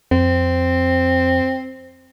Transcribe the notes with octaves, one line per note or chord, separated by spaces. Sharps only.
F2 C4